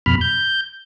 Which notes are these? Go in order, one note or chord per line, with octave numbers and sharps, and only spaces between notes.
F2 B2 B5 F6
G6